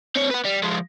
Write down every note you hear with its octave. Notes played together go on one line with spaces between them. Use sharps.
C4 C#5
B4 F#5
G3
F3 G#3